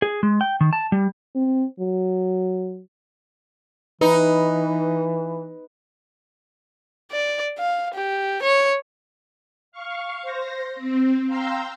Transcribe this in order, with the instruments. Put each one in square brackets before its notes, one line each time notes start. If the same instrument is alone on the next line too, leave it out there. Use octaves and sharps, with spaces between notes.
[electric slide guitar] G#4
G#3
G5
D#3
A5
G3
[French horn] C4
F#3
[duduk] E3 [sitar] D#4 [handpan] B4
[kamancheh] D5
F5
G4
C#5
[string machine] F5 C#6
C5 A#6
C4
F5 G5 A#5 C6 E6